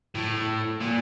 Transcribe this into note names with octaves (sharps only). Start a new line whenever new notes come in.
A2
A#2